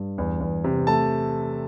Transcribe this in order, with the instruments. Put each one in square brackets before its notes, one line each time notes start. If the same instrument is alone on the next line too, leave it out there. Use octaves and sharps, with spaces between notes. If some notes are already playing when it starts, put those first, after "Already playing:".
Already playing: [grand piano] G2
E2
E2
C3
A3 A5